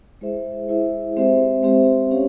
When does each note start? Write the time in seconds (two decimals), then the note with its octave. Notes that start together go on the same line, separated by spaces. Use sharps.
0.21 G#3 E4 G#4 C5 E5
0.68 G#3 E4 G#4 C5 E5
1.16 G#3 C4 G4 C5 E5
1.63 G#3 C4 G4 C5 E5
2.11 C#4 G4 C#5 F5